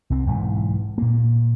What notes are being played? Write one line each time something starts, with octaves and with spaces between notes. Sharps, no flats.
C2 C4
B1 G#2 E3
A#2 A#3